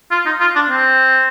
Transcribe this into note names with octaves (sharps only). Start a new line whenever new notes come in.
F4
D#4
F4
D4
C4